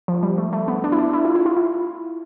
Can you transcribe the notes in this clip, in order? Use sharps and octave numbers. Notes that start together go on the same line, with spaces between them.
F3
G3
A3
A3
B3
D4
E4
D4
E4
F4
E4
F4
E4